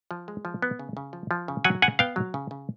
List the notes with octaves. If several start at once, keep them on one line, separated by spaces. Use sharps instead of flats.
F3
G#3
F3
B3
C#3
C#3
F3
F3
C#3
F#3 F#5 G#5
C#3 F#5 G#5
B3 F5 G5
F#3
C#3
C#3